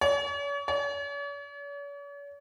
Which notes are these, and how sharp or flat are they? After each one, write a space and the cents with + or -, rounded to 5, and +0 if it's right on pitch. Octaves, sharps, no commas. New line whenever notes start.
C#5 +40
C#5 +45